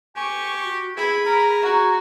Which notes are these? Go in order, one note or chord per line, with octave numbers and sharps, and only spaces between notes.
G4 G#5 C#6
F#4
E4 G#4 B5
A#4 A#5
F#4